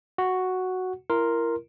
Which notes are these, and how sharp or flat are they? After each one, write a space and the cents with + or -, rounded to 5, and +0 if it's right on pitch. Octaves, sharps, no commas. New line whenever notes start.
F#4 +0 F#5 +0
E4 +35 A#4 +0 C6 +0